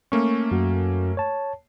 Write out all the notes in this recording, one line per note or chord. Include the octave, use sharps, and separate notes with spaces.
A3 A#3 C#4 C#6
F#2 F#4
C#5 A5